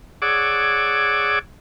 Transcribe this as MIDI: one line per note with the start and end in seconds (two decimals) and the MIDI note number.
0.22 1.39 68
0.22 1.39 73
0.22 1.39 74
0.22 1.39 78
0.22 1.39 86
0.22 1.39 88